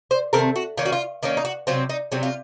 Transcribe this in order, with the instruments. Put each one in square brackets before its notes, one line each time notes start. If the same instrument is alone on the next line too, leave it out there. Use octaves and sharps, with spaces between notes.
[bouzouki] C5
C3 D#3 A3 C4 A#4
F#4
D#3 A#3 C#4 F4
F#4
F4
D#3 A#3 C#4 D#4
D#4
F#4
C3 F#3 C4 F4
D#4
C3 F#3 C4
F4